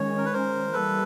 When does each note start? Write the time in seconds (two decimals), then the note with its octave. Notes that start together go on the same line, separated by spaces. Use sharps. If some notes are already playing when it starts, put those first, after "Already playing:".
Already playing: D#3 G#3 C#4 C#5
0.18 A#4
0.26 B4
0.33 A#4 C5
0.73 E3 G3 A#3 A4 B4